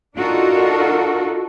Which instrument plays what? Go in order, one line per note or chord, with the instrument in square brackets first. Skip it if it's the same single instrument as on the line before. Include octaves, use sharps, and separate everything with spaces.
[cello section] D4 D#4 F4 F#4 A4 A#4